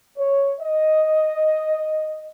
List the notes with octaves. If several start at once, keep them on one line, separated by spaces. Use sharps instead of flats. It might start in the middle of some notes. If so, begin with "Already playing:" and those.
C#5
D#5